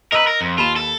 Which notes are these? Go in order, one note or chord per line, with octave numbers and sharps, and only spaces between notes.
A#4 B4 D#5 A#5 E6
A#4
F2
D#2 F4 B5 E7
A4